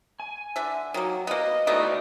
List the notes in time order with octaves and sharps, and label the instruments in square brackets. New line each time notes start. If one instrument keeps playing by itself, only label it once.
[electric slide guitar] G#5
[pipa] D3 E5
[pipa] D#3 A#3 [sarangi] F#3
[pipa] A#3 B3 [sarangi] D#5
[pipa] E3 B3 D#4 [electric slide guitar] F#4 A4 D5